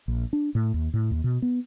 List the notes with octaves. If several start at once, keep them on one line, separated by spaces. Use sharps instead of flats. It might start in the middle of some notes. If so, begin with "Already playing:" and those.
A#1
D4
A2
D#2
A2
D#2
B2
B3